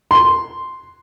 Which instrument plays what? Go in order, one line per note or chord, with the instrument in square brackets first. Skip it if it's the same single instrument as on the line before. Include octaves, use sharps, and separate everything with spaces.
[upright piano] C6